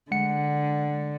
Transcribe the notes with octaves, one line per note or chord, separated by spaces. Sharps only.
D3 G#3 F#5 C#7